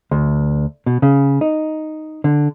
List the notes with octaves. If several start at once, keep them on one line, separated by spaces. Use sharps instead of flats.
D2
B2
C#3
D#4
D3